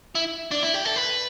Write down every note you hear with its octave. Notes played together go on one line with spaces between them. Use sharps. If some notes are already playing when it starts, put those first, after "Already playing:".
E4
D4
E4
G4
A4
B4